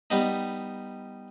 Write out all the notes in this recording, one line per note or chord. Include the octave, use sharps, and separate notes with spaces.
G3 B3 D#4